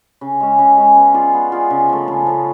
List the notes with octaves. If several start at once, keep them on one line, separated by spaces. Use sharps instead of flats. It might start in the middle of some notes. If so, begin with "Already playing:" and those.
C#3
G#3 C#4
C#3
G#3 C#4
B3
F4 G#4 D5
B3
F4 G#4 D5
C#3
F3 A3
C#3
F3 A3